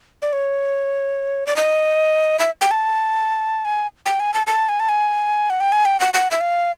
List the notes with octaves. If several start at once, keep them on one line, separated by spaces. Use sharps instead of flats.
D5
C#5
D5
D#5
E5
G5
A5
G#5
G5
G#5
A5
A5
G#5
A5
G#5
F#5
G5
G#5
G5
F#5
F#5
E5
F5